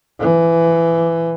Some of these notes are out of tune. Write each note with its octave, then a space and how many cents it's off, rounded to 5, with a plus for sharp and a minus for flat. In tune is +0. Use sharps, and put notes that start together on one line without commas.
E3 +15